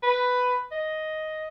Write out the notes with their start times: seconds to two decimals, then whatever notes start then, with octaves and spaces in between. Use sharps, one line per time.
0.03 B4
0.72 D#5